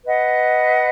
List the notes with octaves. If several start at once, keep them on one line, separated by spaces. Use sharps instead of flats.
B4 D#5 F#5